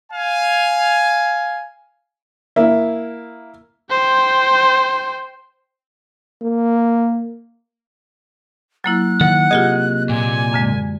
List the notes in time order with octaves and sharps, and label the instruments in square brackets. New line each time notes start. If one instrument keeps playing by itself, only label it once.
[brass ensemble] F5 G#5
[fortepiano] A#3 E4 E5
[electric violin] C5 G5
[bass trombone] A#3
[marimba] F#3 A#3 E4 [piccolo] F#6
[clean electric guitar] D#3 [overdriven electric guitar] F#5
[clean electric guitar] C3 A#3 D#5 [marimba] F4 G4 G#4
[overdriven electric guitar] A#2 [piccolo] G#5
[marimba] F#2 D3 G#3